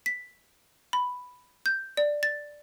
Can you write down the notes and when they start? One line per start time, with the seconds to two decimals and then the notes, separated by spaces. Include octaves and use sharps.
0.06 B6
0.93 B5
1.66 G6
1.97 D5
2.23 A6